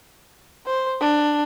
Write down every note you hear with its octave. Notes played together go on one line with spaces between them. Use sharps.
C5
D4